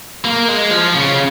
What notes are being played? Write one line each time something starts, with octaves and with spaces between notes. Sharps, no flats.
A#3
G#3
F3
C#3